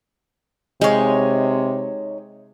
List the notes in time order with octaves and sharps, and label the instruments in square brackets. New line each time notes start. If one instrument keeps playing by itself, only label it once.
[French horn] C3 [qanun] G#3 F5 [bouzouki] D#4 C#5